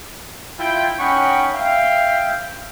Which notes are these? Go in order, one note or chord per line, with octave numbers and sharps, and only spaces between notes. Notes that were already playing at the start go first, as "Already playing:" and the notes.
E4 F4 G5
C#4 D#4 F#5 G5 B5 C#6
E5 F5 G5